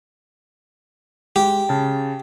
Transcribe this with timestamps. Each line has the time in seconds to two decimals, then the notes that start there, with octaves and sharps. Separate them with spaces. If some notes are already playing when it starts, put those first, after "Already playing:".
1.36 G#3 G4
1.69 C#3 A5